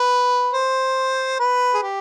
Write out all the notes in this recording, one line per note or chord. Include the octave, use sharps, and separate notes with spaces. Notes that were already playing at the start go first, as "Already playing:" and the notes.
Already playing: B4
C5
B4
G#4
G4